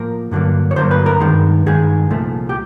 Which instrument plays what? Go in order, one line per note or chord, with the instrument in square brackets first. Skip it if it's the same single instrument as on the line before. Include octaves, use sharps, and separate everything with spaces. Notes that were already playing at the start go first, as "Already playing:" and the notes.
Already playing: [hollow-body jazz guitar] A2 F3 A#3 A#4
G2 D3 F#3 A#3
C#5
G2 D3 F#3 A#3 C5
B4
A#4
G2 D#3 G#3
G2 D#3 G#3 G#4
C2 A#2 F3 A3
G4